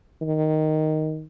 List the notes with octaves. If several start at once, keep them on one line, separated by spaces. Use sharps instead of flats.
D#3